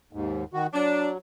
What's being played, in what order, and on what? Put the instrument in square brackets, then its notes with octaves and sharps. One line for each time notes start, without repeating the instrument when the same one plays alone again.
[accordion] D#2 G#2
D#3 F#4
[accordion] F#3 [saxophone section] D4